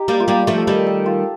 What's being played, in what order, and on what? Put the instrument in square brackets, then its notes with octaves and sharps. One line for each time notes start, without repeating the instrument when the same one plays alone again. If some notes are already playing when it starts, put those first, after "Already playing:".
Already playing: [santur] D#4 G4
[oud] G3 A#3
[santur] F4
[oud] G3 A#3 [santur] G4
[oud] F3 A3
[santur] A4
[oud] D#3 G3
[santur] A4
F4